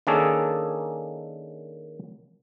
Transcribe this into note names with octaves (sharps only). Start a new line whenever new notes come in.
D#3 A#3 C#4 D4 G#4 A4